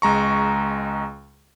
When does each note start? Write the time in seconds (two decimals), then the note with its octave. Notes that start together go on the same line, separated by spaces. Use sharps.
0.02 C#2 G#3 A#5 C#6